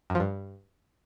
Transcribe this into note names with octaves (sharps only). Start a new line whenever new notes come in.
F#2
F3
G2